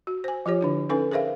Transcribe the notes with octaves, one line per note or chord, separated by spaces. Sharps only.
F#4
C5 G#5
F3 F4 G4 C#5
D3 D4 E4
C#4 D#4 A4 B4 G#5
G#4 A#4 C5 E5 F5